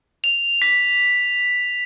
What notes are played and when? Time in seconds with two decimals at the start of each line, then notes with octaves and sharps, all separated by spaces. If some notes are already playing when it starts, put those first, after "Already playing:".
0.24 F7
0.62 B6